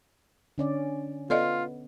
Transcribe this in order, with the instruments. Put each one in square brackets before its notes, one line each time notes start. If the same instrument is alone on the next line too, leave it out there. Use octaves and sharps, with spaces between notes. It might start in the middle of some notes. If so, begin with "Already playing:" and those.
[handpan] D3 C#4 D5
[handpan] B3 [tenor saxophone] F4 [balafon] A4 D5 D#5